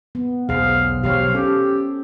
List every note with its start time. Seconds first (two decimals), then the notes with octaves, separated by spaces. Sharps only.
0.15 B3
0.49 B1 E2 G#4 C5 F5
1.03 E1 B1 F#3 G4 C5 C#5 F5
1.35 C#4 G4 A4